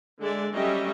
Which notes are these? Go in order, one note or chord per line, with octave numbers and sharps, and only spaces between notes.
D3 G#3 D5 E5
F#3 G3 A3 C#4 D#5 E5